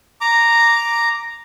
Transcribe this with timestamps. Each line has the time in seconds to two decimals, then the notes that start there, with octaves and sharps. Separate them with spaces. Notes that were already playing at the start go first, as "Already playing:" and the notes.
0.21 A#5 D6